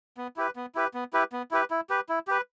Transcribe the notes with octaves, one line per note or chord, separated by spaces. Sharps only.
B3
E4 G4 B4
B3
E4 G4 B4
B3
E4 G4 B4
B3
E4 G4 B4
E4
G4 B4
E4
G4 B4